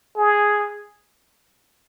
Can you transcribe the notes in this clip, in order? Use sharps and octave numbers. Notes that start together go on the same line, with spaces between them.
G#4